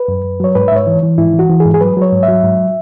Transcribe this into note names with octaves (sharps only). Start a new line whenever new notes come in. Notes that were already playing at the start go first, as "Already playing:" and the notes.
Already playing: B4
F#2
F#2
F#3 C#5
G#2 B4
E5
G#2 C#5
E3
E3
G#2 E4
E3
F#4
E3
G#4
G#2
G#4
F#3 B4
F#3
C#5
G#2
E5
F#3
G#2